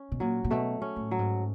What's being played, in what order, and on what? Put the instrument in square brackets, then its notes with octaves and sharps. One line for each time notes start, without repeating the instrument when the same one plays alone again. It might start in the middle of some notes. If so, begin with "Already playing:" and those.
Already playing: [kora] C#4
[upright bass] B2
[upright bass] A#2 [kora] F#3
[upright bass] A#2
[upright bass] B2 [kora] A3
[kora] C#4
[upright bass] A2
[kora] F#3
[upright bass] G#2